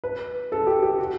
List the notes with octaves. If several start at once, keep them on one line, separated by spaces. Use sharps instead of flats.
B4
A4
G4
G4
F#4